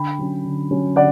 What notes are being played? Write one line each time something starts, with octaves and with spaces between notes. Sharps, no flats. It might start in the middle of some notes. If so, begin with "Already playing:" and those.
Already playing: D3 G5 B5
F#3 C#4
D3
F#3 C#4
D3 D5 F#5